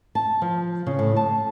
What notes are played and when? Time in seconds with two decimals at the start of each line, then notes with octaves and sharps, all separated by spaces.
0.15 A5
0.42 F3
0.87 C#3
0.99 A2
1.16 A5